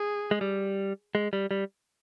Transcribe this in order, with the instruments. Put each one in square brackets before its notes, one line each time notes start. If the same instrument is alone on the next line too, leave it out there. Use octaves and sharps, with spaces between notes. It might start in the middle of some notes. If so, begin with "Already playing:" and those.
Already playing: [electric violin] G#4
[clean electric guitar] G#3
G3
G#3
G3
G3